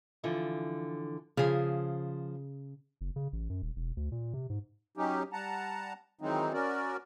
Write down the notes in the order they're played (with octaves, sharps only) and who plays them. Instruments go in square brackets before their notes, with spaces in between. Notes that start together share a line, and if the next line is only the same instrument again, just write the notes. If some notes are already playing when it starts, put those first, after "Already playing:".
[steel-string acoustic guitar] D3 E3 F3
[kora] C#3 G#4 [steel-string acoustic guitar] F3 C5
[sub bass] F#1
C#3
A1
F#2
D#1
E1
D2
A#2
C3
G#2
[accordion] F#3 C#4 D#4 G4
G3 F#5 A5 A#5
D#3 E3 F#3 G#3 C4 D#4
C#4 F#4 A#4 D5